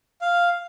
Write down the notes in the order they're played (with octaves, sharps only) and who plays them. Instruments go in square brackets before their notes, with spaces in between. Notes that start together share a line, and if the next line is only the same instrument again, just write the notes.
[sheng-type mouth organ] F5